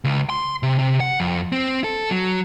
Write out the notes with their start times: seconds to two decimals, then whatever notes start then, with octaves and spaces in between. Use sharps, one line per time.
0.04 C#2
0.30 C6
0.63 C3
0.79 C3
1.00 F#5
1.20 F2
1.52 C4
1.84 A4
2.11 F#3